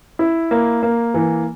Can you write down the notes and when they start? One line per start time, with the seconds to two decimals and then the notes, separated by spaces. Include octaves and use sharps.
0.19 E4
0.51 A#3
0.83 A#3
1.14 E3